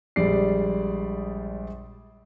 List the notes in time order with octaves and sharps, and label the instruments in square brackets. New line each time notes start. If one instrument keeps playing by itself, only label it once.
[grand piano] A#1 G3 G#3 D5 C7